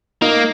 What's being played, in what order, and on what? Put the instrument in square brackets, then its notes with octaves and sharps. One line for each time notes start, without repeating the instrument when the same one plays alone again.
[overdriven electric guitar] A#3 [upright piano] D#4